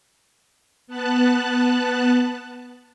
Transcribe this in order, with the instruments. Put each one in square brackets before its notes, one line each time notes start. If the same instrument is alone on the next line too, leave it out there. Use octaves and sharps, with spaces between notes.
[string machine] B3 A5 F#6